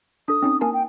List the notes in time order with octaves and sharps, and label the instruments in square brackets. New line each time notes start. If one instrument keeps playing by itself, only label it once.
[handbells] D4 A4 [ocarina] D#6
[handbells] C4 C#4 D#4
[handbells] A#3 A#4 A5 [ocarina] G#5
[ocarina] G5